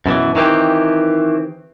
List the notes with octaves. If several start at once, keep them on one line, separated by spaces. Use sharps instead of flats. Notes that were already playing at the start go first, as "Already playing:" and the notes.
F#2 B2 D#3 E3
D#3 E3 C4 G4